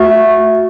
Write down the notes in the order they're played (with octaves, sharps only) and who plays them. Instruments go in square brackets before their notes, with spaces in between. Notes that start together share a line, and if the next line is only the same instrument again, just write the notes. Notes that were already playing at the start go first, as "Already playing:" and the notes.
Already playing: [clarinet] A3 [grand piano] F#4